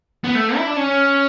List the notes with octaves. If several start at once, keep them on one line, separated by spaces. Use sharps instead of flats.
B3
A3
E4
D4
C#4